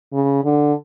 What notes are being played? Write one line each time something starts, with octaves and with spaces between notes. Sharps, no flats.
C#3
D3